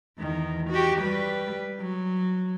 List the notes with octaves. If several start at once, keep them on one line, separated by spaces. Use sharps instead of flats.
E2 D#3
F#4 G4
G3 B4
F#3